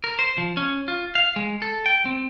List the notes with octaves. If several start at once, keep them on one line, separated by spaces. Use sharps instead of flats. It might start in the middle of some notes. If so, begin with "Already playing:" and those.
A#4
C5
F3
C#4
F4
F5
G#3
A4
G5
C4